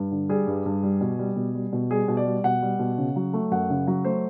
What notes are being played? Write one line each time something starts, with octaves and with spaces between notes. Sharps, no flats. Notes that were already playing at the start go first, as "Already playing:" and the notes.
Already playing: G2
D3
G3 G#4
G2
G2
G3
B2
G3
B2
G3
B2
G3 G#4
B2
D5
G3
B2 F#5
G3
B2
C#3
F#3
A3
F#2 F#5
C#3
F#3
A3 C5